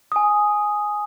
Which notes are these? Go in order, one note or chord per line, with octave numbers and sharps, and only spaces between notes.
G#5 D#6